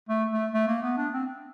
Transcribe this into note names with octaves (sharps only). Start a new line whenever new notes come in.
A3
A3
A3
A#3
B3
D4
C4